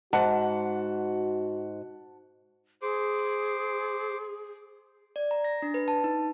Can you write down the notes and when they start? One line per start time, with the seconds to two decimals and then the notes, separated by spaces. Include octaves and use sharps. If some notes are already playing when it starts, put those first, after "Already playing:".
0.13 G#2 F#4 F#5 A5
2.82 G#4 C5 D6
5.16 D5
5.31 A#5
5.44 A#6
5.62 D4
5.74 B4
5.88 A5
6.04 D#4